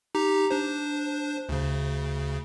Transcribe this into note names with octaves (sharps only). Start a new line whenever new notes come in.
D#4 G4 A#5
D4 C5
D2 C#3